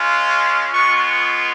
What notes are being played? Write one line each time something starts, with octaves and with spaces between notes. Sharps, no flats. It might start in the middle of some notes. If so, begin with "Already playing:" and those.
Already playing: G#3 C#4 F4
G#3 B3 F4 C#6